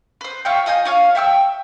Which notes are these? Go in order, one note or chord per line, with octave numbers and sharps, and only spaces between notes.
B4 C5
F4 C#5 E5 G5
F4 D#5 G#5 G6
F4 C#5 D5 F5
E5 G5 C#6 E6